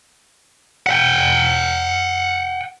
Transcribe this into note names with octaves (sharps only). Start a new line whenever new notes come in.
F#5 G5